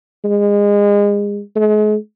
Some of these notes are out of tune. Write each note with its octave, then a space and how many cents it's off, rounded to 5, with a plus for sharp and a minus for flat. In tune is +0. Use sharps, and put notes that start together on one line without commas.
G#3 -30
G#3 +40